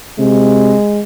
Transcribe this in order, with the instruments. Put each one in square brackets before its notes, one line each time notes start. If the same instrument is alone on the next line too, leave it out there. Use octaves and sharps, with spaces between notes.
[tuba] C3 [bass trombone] G#3